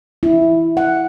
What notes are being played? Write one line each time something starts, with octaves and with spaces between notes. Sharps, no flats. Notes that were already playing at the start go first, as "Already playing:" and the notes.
E4
F#5